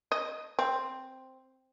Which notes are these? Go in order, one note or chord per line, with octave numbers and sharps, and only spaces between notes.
D#5
C4